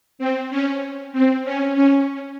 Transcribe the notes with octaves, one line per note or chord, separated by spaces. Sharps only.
C4
C#4
C4
C#4
C#4